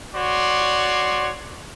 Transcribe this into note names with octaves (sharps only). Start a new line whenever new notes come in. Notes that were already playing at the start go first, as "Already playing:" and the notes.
F#4 C#5 D5 C6